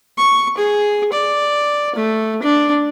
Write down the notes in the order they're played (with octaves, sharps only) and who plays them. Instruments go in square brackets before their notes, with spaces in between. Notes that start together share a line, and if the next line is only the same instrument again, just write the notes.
[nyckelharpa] C#6
G#4
D5
A3
D4